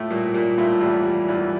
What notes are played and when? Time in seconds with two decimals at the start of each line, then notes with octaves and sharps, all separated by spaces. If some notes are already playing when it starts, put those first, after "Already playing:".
Already playing: A2 A3 F4
0.11 A#2 G3 A#3
0.34 A#2 G3 A#3
0.58 A2 A3 F4
0.81 E2 E3 G3
1.05 G3
1.28 E2 E3 G3